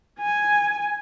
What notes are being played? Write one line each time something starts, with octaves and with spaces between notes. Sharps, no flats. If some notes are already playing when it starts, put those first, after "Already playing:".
G#5